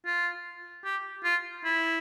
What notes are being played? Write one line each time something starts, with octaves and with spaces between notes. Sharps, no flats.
F4
G4
F4
E4